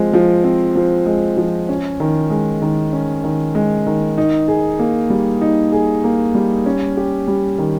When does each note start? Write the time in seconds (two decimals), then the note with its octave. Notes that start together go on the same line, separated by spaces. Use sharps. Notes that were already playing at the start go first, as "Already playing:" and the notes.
Already playing: F3 G#3 C4
0.13 F3
0.44 C4
0.75 F3
1.06 G#3
1.37 F3
1.69 C#4
2.00 D#3
2.30 G#3
2.62 D#3
2.93 C#4
3.24 D#3
3.55 G#3
3.87 D#3
4.18 D#4
4.48 G#4
4.79 A#3
5.10 G3
5.41 D#4
5.72 G#4
6.04 A#3
6.35 G3
6.66 C#4
6.97 G4
7.27 G3
7.59 D#3